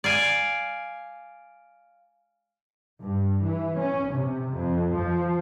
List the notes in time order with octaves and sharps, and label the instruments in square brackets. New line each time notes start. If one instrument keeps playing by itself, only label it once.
[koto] D5 F5 G#5
[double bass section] G2
E3
C#4
C3
F2
F3